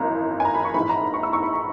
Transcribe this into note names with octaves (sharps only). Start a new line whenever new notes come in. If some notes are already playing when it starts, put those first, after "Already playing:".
Already playing: G#1 F#2 E3 A#3 D#4 A#5
G#5
A#5
B5
C#6
A#1 G#2 E3 B5
A#5
B5
C#6
E6
C#6
B5
A#5